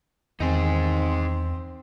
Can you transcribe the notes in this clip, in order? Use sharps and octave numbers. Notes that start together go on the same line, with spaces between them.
E2 D#3 C4 D#4 G#4